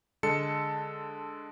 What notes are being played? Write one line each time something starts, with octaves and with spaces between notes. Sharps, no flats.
D3 G#3 A4 A5 C#7